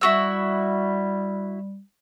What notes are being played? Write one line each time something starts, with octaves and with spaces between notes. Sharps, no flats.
G3 E4 F#4 E6